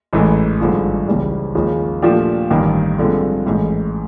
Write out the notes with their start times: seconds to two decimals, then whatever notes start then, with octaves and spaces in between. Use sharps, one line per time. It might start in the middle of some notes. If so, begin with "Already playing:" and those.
0.13 A1 G#2 E3 A3
0.60 G#1 G2 D3 F3 G#3
1.07 C#2 C#3 E3 G3
1.55 D#2 C#3 F3 G#3
2.02 A#2 F3 A3 D4 G4
2.51 A1 G2 D#3
2.99 G2 D3 F3 G#3 C4
3.46 A1 G#2 E3 A3